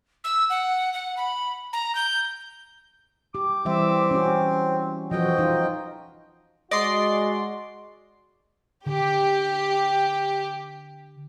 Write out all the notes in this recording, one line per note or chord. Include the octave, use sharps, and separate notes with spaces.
E6
F#5
F#5
B5
A#5
G6
G4 D6
E3 G3 C4 E5
C#4 F#4
F2 E3 F3 F#4 D#5 G5
D#4 F4
G#3 F#4 D5 D#5 C6
D3 G4